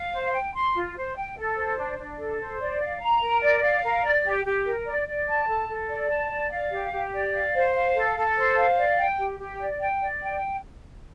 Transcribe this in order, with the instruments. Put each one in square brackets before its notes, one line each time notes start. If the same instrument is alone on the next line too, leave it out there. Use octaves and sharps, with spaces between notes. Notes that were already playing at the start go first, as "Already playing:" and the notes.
Already playing: [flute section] F5
C5
G5
C6
F4
C5
G5
A4
C5
D4
D4
A4
C5
D5
F5
A#5
A#4
D5
F5
A#4
D5
G4
G4
A#4
D5
D5
A5
A4
A4
D5
A5
D5
F5
G4
G4
D5
F5
C5
F5
A4
A4
C5
F5
D5
G5
G4
G4
D5
G5
D5
G5